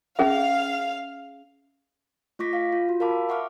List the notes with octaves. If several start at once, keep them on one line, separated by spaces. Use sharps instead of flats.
C#4 G#4 E5 F5
A3 F4 C#6 D6 A#6 B6
F5
F4
F#4
A#4 F5 A5 B5 D6
E5 F#5 C#6 D6 F6